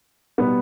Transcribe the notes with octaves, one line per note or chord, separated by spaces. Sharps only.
B2 G3 B3